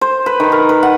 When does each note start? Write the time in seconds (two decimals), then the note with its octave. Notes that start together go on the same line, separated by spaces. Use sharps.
0.01 C5
0.26 B4
0.40 D#3
0.52 A#4
0.69 B4
0.83 F#5